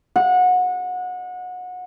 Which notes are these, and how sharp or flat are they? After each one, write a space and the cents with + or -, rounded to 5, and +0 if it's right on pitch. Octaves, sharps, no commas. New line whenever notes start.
F#5 -25